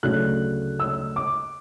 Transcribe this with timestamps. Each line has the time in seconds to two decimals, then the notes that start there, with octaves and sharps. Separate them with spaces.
0.03 D2 C#3 F#3 A3 D4 F#6
0.80 E6
1.16 D6